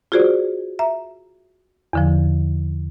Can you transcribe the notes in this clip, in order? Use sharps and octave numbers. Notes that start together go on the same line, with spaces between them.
F4 F#4 G#4 C5 D5
E5 A#5
E2 D3 F3